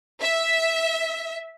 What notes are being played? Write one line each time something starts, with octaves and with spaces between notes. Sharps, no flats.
E5